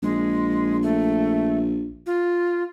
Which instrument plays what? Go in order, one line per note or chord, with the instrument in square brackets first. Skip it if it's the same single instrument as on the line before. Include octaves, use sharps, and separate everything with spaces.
[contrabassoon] A#1 [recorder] G#3
[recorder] A3
F4